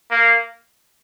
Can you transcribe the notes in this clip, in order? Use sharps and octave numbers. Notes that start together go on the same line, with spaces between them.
A#3